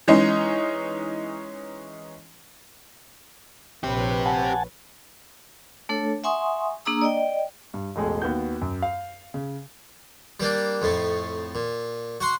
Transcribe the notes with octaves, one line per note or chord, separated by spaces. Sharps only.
E3 G#3 C#4 D#4
A#1 C4 G4 B4 C#5
F#5 G#5 A5
A3 D4 A4 C#5
E5 F#5 G#5 C6 C#6 D#6
A#3 D4 G#4 A#5 D#6 E6
D5 D#5 G5
G2
E1 A1 G#3 G#4 A4
D#2 B3 F#4 G6
F#2
F5
C#3
G3 A#3 D4
F2 A2 A3
A#2
F#4 F#5 C6